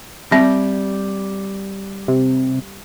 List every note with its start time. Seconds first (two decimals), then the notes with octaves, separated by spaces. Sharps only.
0.32 G3 C4 E5
2.08 C3